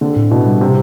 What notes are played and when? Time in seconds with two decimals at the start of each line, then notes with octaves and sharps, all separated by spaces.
0.01 D3 C4
0.16 A2
0.31 B2 E4
0.46 G3
0.61 C3 C4